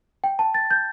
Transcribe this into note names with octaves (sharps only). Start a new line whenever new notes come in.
G5
A5
A6
G6